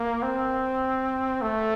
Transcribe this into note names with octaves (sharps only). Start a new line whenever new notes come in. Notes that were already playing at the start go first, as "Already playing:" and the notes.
Already playing: A#3
C4
A3